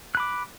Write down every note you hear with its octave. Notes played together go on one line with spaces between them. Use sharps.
B5 D6 F#6